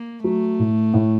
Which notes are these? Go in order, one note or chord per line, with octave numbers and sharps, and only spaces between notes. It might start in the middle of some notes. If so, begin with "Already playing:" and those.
Already playing: A#3
F#3 A3
A2
A2